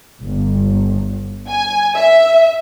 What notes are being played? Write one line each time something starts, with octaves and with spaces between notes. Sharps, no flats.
G1
G#5
E5